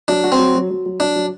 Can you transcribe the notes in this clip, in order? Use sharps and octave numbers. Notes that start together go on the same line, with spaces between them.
F#3 D4
F#4
C4
F#3
F#3
F#3
F#3
F#3 D4
F#3